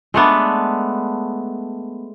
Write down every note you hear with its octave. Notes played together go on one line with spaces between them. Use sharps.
G#3 A3 B3 D4